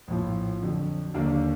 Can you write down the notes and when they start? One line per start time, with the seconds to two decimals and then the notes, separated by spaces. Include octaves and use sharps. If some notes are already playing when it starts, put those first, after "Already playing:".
0.08 A#1 A2 F3
0.61 F2 D3 F#3
1.14 D#2 D3 F#3 A#3 D4